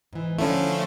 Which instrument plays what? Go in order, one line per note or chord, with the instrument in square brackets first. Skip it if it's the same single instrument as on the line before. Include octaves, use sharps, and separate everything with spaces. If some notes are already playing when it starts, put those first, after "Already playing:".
[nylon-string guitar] G#2 E3
[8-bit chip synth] D3 F3 A3 [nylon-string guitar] C#4 E4